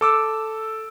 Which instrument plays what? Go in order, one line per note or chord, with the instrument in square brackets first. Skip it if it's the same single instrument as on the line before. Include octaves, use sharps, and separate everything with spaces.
[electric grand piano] A4 D6 E6